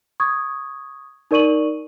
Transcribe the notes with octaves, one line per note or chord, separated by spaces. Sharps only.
C#6 D#6 G#6
D#4 A#4 D5 C#6 D#7 F#7